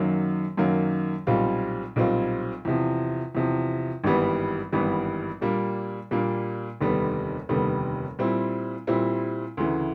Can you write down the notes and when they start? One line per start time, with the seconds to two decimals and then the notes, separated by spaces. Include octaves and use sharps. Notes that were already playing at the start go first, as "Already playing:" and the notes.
Already playing: F#2 D#3 F#3 A#3
0.57 F#2 D#3 F#3 A#3
1.27 B1 A#2 G3 C4 F4
1.96 B1 A#2 G3 C4 F4
2.65 E2 C3 F3
3.35 E2 C3 F3
4.04 G#1 G2 E3 G3 B3
4.72 G#1 G2 E3 G3 B3
5.41 A#2 G3 A#3 D4
6.11 A#2 G3 A#3 D4
6.81 F1 D#2 D3 G3 B3
7.49 F1 D#2 D3 G3 B3
8.19 A#2 G3 C4 E4
8.87 A#2 G3 C4 E4
9.57 D2 C#3 E3